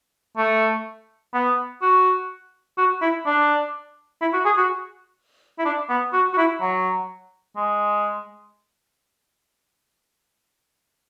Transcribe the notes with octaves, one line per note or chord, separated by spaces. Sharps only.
A3
B3
F#4
F#4
E4
D4
E4
F#4
G#4
F#4
E4
D4
B3
F#4
F#4
E4
F#3
G#3